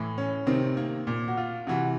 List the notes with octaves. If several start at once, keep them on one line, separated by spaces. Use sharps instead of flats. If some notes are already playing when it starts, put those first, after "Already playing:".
Already playing: A2 E3
C#4
C3 D#3 C4
A#3
A#2
F#4
F4
C3 E3 F#4